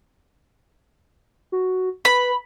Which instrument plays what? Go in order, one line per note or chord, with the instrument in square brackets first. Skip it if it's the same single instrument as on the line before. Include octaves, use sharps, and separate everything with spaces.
[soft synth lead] F#4
[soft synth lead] B4 [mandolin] B5